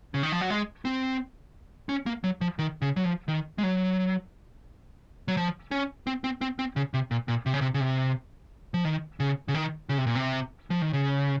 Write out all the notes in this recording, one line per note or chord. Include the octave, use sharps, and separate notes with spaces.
C#3
D#3
F3
F#3
G#3
C4
C#4
A#3
F#3
F3
D#3
C#3
F#3
F3
D#3
G#3
F#3
F#3
F3
C#4
C4
C4
C4
C4
C#3
C3
A#2
A#2
C3
C#3
C3
C#3
C3
F3
D#3
C#3
C#3
D#3
C#3
C3
A#2
C3
F3
D#3
C#3